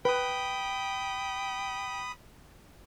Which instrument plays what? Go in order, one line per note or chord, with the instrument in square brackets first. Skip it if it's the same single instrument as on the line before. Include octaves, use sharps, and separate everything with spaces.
[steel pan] B4 [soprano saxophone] G5 [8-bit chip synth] B5 D#6